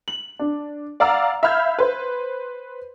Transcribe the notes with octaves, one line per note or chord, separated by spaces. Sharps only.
F#7
D4
D5 F5 F#5 A#5 E6
E5 F5 B5 F6 G6 G#6
B4 C5